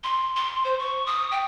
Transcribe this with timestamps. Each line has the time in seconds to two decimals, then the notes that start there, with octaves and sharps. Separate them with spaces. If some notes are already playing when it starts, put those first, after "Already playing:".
0.04 C6
0.36 C6
0.65 C5
0.79 C#6
1.06 D#6
1.31 G5